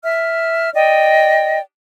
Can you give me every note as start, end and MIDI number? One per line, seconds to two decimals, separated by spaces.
0.04 0.71 76
0.04 0.71 89
0.74 1.59 74
0.74 1.59 75
0.74 1.59 79